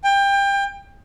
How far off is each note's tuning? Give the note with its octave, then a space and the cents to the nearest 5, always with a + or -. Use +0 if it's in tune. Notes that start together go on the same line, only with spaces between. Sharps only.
G5 +25